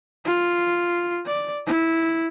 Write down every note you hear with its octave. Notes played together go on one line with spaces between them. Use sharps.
F4
D5
E4